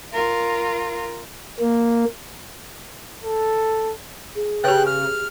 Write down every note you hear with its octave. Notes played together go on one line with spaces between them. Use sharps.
F4 A#4
A#3
A4
G#4
C#3 G4 B4 G5 F#6
F6